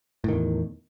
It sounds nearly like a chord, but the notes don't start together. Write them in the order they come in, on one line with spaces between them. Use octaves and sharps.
A2 D#3 E2